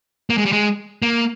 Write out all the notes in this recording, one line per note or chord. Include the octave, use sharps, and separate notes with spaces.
A#3
G#3
G3
G#3
A#3